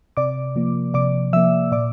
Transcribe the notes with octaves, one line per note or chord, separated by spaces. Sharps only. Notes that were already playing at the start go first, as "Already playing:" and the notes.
C3 D5 D6
F3 A#3
C3 D5 D6
F3 A#3 E5 E6
A#2 D5 D6